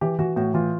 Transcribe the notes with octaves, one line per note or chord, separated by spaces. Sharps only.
E3 G4
E3 F#4
A2 F#4
E3 F4